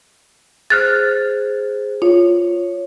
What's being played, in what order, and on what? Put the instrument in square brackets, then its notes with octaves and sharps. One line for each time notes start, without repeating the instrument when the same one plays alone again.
[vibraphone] G#4 C5 [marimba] F6 F#6 A6
[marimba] F4 [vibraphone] C#5